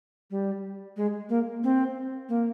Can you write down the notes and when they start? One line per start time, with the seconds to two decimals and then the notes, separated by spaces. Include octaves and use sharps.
0.31 G3
0.97 G#3
1.29 A#3
1.64 C4
2.29 A#3